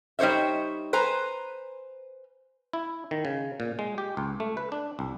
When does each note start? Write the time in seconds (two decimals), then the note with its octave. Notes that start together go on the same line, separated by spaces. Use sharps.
0.19 G3 D#4 C5 C#5 E5
0.93 B4 C5 G#5 A#5
2.73 E4
3.11 D#3
3.25 C#3
3.60 A#2
3.79 G#3
3.98 G4
4.17 C#2
4.40 A3
4.57 B4
4.72 D4
4.99 C2